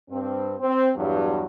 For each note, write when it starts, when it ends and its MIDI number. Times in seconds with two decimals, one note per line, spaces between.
0.10 0.54 43
0.10 0.54 60
0.60 0.90 60
0.96 1.46 40
0.96 1.46 43
0.96 1.46 54